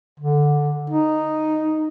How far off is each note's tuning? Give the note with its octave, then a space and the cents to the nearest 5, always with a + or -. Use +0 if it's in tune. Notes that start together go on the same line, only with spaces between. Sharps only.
D3 +0
D#4 -5